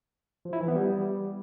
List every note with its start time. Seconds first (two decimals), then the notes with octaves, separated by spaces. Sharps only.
0.45 F3
0.53 E4
0.60 E3
0.68 B3
0.76 G3